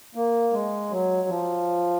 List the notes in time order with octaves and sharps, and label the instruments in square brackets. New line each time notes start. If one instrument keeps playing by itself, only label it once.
[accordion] A#3
G#3
F#3
F3